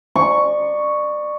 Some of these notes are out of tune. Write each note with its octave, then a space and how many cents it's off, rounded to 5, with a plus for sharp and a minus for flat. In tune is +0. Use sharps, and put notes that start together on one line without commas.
D5 +30 C#6 +0